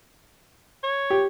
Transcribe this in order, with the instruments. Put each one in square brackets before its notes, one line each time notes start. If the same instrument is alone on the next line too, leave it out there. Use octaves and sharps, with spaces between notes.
[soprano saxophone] C#5
[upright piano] G4